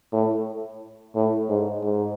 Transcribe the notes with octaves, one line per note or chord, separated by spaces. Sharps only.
A2
A2
G#2
G#2